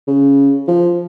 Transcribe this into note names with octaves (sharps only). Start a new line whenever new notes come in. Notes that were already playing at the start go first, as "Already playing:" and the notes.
C#3
F3